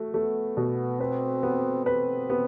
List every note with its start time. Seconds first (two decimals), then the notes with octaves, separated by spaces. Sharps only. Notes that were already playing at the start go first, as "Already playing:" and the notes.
Already playing: A3 F#4
0.14 A3 B3
0.57 B2
1.00 C4 B4
1.43 B3
1.86 C4 B4
2.30 B3